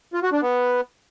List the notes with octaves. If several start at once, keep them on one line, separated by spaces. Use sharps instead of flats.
F4
F#4
D4
B3